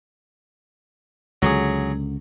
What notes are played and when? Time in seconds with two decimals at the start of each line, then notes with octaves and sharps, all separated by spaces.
1.42 C#2 D3 F#3 G#4